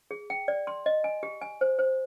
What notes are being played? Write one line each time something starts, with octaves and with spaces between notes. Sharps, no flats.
G#4
G5
D5
C6
D#5
G#5
G4
G#5
C5
C5